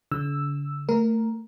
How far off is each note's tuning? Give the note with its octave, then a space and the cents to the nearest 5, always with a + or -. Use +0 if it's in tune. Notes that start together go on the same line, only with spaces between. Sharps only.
D3 -45 E6 +0
A3 +25 A#4 +0